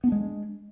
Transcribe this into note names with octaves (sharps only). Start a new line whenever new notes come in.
G#3 B3 D4